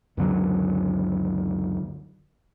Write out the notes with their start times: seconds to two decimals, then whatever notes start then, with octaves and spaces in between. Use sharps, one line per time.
0.17 C#2 F#2 D3 F#3